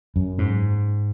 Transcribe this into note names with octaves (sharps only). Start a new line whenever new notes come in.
F#2
G#2